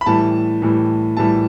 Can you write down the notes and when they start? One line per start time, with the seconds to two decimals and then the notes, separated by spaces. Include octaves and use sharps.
0.01 B5
0.06 A2 E3 G3 A5
0.62 A2 E3 G3
1.17 A2 E3 G3 A5